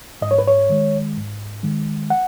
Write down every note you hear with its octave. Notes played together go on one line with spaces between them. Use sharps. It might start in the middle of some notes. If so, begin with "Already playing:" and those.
G#2 D#5
C#5
B4
C#5
D#3 G#3
G#2
D#3 G#3
F#5